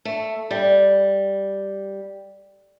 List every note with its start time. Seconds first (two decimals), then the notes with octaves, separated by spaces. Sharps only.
0.05 A3
0.51 G3